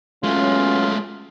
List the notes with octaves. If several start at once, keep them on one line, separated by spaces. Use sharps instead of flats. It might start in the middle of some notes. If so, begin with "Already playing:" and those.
F#3 G#3 A3 B3 C#4 F4